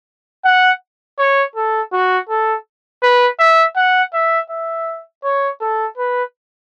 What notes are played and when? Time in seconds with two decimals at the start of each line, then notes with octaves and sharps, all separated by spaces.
0.45 F#5
1.19 C#5
1.56 A4
1.93 F#4
2.30 A4
3.03 B4
3.40 E5
3.76 F#5
4.13 E5
4.50 E5
5.24 C#5
5.61 A4
5.98 B4